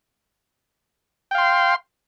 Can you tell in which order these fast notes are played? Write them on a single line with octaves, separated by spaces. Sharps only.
G5 F5 C6